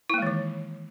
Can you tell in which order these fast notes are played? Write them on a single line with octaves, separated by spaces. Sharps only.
E4 A#3 G#3 E3 D#3